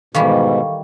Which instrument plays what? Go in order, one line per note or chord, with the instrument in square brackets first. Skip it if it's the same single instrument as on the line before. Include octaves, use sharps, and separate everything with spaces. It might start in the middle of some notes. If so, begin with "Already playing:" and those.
[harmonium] G#2 B2 [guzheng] D#3 E3 G3 [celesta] A4 F5 C#6